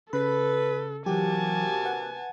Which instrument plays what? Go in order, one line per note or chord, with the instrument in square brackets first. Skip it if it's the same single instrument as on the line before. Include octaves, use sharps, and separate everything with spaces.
[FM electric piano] C#3 [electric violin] A4 [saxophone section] B4 [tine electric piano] B5
[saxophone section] C3 A#3 F#4 [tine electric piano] E3 F#3 [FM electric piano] G4 [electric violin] G#5 A5
[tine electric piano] B4 [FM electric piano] F#5